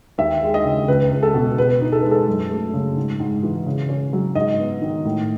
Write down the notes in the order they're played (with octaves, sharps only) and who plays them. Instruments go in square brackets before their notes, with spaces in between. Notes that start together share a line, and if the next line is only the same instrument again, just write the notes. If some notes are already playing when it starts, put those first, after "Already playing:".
[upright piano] D#2 E5
G#3
D#5
C#3
C#2 B4
C#2
A4
B2
B2 B4
D#4
A4
G#3 B4
A4
F#2
A3
C#3
G#2
G#2
E3
C#3
C#4
F#3
G#2 D#5
B3
D#3
A2